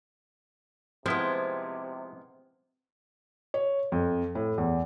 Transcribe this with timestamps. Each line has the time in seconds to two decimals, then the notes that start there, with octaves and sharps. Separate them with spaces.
1.06 C3 F3 G#3 B3 C4 E4
3.54 C#5
3.92 F2
4.35 A2
4.58 E2